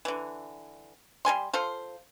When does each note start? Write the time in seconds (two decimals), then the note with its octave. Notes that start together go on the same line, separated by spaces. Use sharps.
0.05 D3 E3
1.25 G3 A#4 G#5 C6
1.53 F4 A4 C5